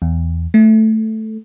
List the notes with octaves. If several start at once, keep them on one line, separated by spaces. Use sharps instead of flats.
E2
A3